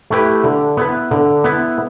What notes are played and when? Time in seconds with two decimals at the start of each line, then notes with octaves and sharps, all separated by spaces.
0.10 A3 E4 G4 B4
0.44 D3
0.77 B3 E4 B4
1.11 D3
1.44 B3 E4 B4